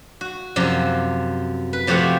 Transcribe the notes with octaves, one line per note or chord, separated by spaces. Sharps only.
F#4
F#2 C3 F3
B4
C3 F3 A3 F#4 G4 F#5